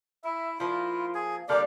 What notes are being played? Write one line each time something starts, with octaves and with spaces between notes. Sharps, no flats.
E4 E5
F3 A#3 E4 F4
G#4
D3 G3 A#3 G4 D5 F5